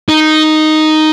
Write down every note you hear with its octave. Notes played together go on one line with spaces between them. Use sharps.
D#4